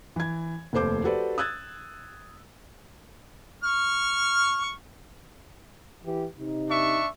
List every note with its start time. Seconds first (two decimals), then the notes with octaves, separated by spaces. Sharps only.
0.16 E3 G#6
0.73 F1 D#2 A3 C5 D6 G6
1.04 F#4 G4 A4 B4 C5 D5
1.38 D#6 E6 F#6 G#6 A6
3.64 C#6 F6
6.04 E3 E4 G4
6.38 C3 D#4
6.69 D4 E5 C#6